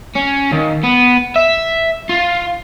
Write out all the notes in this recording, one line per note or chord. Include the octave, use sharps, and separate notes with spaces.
C#4
D#2
B3
E5
F4